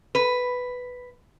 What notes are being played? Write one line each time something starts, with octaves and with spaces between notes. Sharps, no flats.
B4